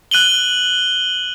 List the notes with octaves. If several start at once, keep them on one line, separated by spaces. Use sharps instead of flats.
F#6 D#7 F#7 G7